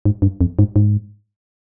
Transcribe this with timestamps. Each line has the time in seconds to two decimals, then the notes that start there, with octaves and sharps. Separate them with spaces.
0.05 G#2
0.22 G2
0.41 F2
0.59 G#2
0.76 G#2